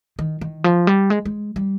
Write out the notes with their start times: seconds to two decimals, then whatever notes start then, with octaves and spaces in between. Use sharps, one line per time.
0.19 D#3
0.41 D#3
0.64 F3
0.87 G3
1.10 G#3
1.25 G#3
1.56 G3